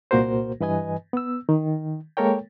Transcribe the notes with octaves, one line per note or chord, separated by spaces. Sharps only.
C2 A#2 A#3 F#4 A#4 C5
G2 E3 B4 D#5 G#5
B3 E6
D#3
G#3 A#3 A4 A#4 C#5 G5